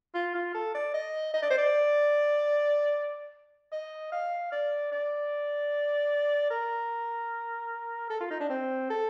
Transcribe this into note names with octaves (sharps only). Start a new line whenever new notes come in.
F4
F4
A4
D5
D#5
D#5
D5
C5
D5
D#5
F5
D5
D5
A#4
A4
F4
D#4
D4
C4
A4